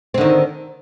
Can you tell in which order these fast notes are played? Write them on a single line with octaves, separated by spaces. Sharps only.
C4 D3 D#3